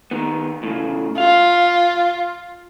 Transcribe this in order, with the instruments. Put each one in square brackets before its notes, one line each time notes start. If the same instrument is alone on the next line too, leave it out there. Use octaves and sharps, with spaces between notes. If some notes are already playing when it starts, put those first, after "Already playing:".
[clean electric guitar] D#3 B3
A2 C#3
[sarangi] F4 [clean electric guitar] F5